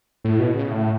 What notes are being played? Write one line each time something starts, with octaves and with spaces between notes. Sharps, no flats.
A2
B2
C#3
A2